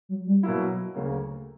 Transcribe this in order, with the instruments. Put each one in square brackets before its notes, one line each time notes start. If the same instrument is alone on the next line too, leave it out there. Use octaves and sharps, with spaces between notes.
[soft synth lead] F#3
G3
[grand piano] B2 A#3 E4 [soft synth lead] F#3
[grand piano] D2 C#3 F#3 A#3